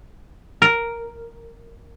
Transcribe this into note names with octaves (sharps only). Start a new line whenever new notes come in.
A#4